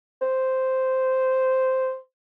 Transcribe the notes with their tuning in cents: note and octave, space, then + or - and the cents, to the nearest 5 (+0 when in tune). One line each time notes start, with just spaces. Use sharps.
C5 -5